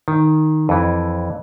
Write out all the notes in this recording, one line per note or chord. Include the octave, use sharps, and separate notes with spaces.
D#3
F2 E3